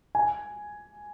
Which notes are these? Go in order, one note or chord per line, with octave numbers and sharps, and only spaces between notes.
G#5